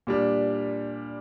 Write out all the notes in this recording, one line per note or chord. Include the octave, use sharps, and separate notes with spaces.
A#2 G3 D4